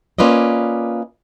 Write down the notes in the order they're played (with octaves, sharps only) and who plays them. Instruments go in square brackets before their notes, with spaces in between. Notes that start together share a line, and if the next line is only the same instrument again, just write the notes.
[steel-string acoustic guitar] A#3 C#4 F4 B4 D5 D#5